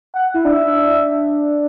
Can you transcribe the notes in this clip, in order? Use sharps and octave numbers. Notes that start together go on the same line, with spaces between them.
F#5
E4
D4 E5